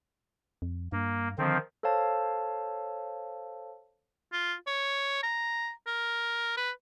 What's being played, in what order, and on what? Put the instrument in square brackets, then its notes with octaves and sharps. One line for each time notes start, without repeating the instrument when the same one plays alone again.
[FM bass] F2
[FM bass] G2 [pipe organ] A#3
[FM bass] D3 [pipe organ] D#3 F3 C4
[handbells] A4 C5 C#5 F5 A5
[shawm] F4
C#5
A#5
A#4
B4